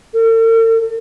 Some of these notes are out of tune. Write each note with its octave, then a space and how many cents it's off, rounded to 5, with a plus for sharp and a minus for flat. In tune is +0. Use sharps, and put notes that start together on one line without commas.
A4 +45